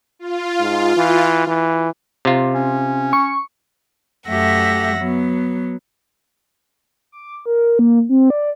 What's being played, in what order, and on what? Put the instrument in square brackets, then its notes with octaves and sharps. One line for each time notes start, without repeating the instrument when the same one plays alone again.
[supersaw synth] F4
[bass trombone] G#2
E3
E3
[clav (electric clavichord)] C3 F4
[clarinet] C#4
[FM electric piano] C#6
[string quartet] F#2 A3 G4 E5 F#5 A#6
F#3 B3
[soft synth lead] D6
A#4
A#3
C4
D5